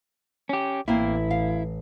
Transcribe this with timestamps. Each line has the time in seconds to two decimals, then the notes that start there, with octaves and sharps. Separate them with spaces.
0.49 C#4 G4
0.88 A1 A#3 C4 E4
1.31 F5